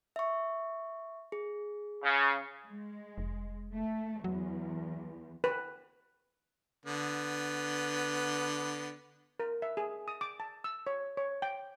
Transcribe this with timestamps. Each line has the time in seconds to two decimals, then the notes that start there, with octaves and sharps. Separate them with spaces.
0.16 E5 C#6
1.32 G#4
2.04 C#3
2.67 G#3
3.18 F1
3.74 A3
4.24 E2 F#3
5.44 B4
6.85 D3 B3
9.40 A#4
9.62 E5
9.77 G#4
10.08 D#6
10.21 D6
10.40 A5
10.64 E6
10.87 C#5
11.17 C#5
11.42 G5